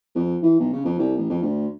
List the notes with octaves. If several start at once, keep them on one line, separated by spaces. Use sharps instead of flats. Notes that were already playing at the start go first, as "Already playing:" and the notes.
F2
E3
B1
C#3
F2
C2
A1
F2
D2